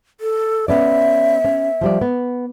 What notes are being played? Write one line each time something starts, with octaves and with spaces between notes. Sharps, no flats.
A4
B3 C#4 D5 E5
C#4
F3 G3 D5
B3